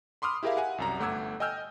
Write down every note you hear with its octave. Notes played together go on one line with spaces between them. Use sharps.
B5 C6 D6 D#6 F6
E4 G4 G#4 A#4 E5 F5
F#5 G#5
C2 F#2 A#5
G1 A3 F#5 D6 E6 G#6
D#5 G5 G#5 E6 F6 G6